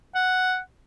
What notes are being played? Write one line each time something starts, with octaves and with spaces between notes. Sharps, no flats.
F#5